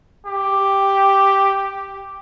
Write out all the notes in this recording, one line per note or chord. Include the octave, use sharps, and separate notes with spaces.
G4